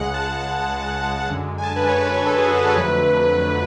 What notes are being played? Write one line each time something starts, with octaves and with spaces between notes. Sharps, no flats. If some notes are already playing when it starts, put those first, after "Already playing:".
Already playing: C#2 C#3 G#3 F#5
A5
F#2 D3 G#3
G#5
A5
B4
C#5
B4
C#5
A4
G#4
F#4
G#4
B4
F2 D3 F#3 A3